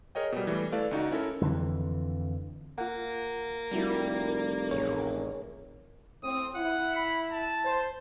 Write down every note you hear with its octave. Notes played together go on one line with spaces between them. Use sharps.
G#4 A#4 C#5 D#5 G5
B2 G3
E3 G3 A3
A3 E4 A4 B4 D5 F5
C#2 D#4 F#4
C#4 E4 A4 A#4
F2 D3 E3
A#3 F4 F#5
F1 G3 E4 F#4 A#4
A1 G#4 A#4 C#5
A2 C4 D#6
E4 F#5
B5
A5
C5